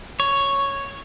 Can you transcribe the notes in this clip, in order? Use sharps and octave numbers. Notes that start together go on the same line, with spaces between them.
C#5